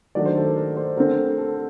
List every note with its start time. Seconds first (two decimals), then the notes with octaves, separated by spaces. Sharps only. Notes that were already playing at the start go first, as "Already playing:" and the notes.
0.15 D#3 F#3 A3 D4 D5
0.26 C5
0.36 A4
0.46 A#4
0.56 A#4
0.77 C5
0.97 D3 A3 C4 A#4
1.38 A4